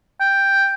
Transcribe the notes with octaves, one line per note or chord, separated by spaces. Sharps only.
G5